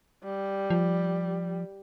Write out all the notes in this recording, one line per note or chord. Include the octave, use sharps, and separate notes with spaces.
G3
F3